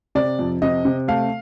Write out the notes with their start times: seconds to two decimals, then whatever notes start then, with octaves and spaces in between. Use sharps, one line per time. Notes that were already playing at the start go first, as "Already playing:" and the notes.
0.15 C3 D5
0.39 F2
0.62 C3 D#5
0.85 C3
1.08 A3 F5